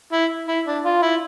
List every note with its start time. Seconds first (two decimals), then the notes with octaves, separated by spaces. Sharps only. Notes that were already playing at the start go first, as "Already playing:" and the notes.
0.13 E4
0.48 E4
0.67 D4
0.85 F4
1.03 E4